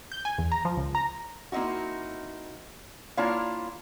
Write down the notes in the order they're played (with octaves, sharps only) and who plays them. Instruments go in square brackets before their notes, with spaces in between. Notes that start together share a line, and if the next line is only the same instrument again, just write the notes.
[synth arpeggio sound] G6
G#5
E2
A#5
F3
C#2
A#5
[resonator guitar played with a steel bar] A#3 C4 D#4 E4 F#4
A#3 D4 E4 F4 C#5 F5